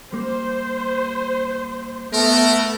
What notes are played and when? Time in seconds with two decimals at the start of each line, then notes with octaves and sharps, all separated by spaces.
0.12 G3 A#3 C5
2.14 A3 B3 A#4